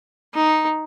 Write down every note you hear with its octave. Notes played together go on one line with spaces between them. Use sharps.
D#4